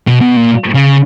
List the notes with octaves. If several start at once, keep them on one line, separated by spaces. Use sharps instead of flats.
B2
B2
A#2
C#3